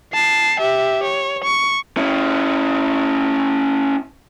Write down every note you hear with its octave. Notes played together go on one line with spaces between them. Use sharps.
A5 C7
G4 E5
C#5
C#6
C#4 E4